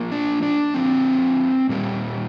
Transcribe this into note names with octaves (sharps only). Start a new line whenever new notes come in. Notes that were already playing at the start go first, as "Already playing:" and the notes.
Already playing: F3 A#3
D4
D4
D3 F3 A#3 C4
A#2 G3 A#3